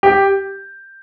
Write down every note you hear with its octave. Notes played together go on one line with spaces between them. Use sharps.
G4